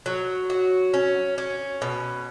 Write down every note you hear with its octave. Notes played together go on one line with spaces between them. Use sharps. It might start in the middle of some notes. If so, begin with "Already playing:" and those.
F#3
F#4
C#4
C#4
B2